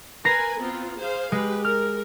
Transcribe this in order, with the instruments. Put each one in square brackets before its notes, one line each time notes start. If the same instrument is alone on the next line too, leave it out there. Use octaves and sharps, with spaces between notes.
[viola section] A#4 B4 G#5 [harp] A#5 A#6 C7
[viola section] B3 C4 F4
G#4 C5 F5
[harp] G#3 [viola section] G4 B4
[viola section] A#4 [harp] F6